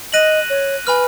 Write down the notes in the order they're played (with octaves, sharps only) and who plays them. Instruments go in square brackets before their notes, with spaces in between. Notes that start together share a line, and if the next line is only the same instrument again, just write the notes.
[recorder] D#5 [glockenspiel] F#6 A#6 D#7 F#7
[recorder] C#5
[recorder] B4 [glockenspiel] G#5 B5 F6